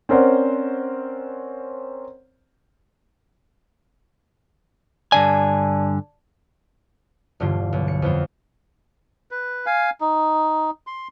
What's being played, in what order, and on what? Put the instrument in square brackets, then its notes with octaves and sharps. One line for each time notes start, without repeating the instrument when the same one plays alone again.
[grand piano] C4 C#4 A#4 C5 D5 F#5
[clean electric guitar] G2 D3 G#5 [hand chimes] D5 A5
[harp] E1 G2 D3 F4
B1
C#7
F2 B3 F4
[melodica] B4
F5 G#5
D#4
C6